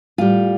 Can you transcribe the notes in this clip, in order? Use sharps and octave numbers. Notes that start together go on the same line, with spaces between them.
A2 G3 F4